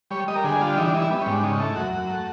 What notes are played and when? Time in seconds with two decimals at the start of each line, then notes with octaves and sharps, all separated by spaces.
0.11 G3 C#5
0.28 G3 D#5
0.35 A#4
0.44 D3 G#4
0.60 G3 F4
0.77 E3 D#4
0.85 D4
0.94 G3 D#4
1.02 E4
1.10 G3 B3
1.21 C#4
1.26 G#2
1.32 D4
1.43 C#3 D#4
1.60 A3 E4
1.76 F#2 F#4
1.93 F#2
2.09 A3